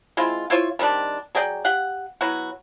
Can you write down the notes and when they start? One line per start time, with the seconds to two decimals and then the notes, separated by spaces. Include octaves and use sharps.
0.17 G#3 C4 E4 F4
0.50 E4 F4 C5 C#5
0.79 D#3 G3 C4 D4
1.35 F#3 G#4 D5 G5
1.65 G4 F5 F#5
2.21 F#3 B3 E4 F#4